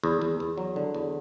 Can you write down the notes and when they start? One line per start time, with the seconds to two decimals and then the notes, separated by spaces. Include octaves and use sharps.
0.04 E2
0.22 E2
0.40 E2
0.58 F#3
0.76 D3
0.95 E2